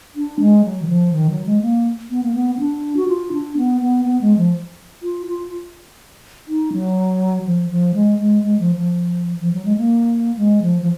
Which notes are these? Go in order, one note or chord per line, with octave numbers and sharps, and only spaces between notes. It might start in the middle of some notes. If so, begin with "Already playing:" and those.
D4
G#3
F#3
D#3
F3
D#3
F#3
G#3
A#3
B3
A#3
B3
B3
D4
F#4
F4
D4
B3
B3
B3
G#3
F3
F4
F4
D#4
F#3
F3
F3
G#3
G#3
G#3
F3
F3
F3
F#3
G#3
A#3
G#3
F3
F3